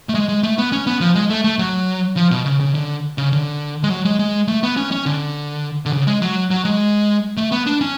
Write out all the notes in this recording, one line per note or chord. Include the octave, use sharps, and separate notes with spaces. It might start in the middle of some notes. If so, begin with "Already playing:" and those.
A3
G#3
G#3
A3
B3
C#4
B3
F3
G#3
A3
A3
F#3
F3
B2
C#3
C#3
D3
C#3
D3
G#3
F#3
G#3
G#3
A3
B3
C#4
C#4
D3
D3
C#3
G#3
F#3
F#3
G#3
A3
B3
D4
C#4